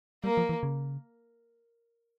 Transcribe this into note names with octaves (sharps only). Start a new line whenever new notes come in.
G3 A#3
F3
E3
C#3